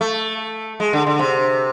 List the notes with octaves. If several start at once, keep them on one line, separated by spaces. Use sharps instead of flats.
A3
G#3
D3
D3
C3